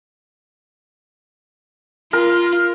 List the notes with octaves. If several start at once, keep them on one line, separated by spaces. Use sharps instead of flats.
F4 A#4